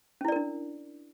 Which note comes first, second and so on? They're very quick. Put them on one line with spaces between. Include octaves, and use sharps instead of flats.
C#4 E4 D5 A#4 D4